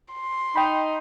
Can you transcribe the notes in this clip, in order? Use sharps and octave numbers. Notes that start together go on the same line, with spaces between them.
C6
D#4 G5 B5